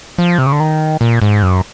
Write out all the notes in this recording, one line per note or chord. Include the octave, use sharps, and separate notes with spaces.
F3
C3
C#3
D3
D#3
A#2
G#2
F#2